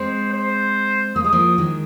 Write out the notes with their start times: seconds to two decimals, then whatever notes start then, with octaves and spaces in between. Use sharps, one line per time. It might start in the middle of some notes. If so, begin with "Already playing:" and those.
Already playing: G#3 C4 C5
0.32 C5
1.16 A#3 D#6
1.24 G#3
1.32 F3 A#3
1.58 D#3 G#3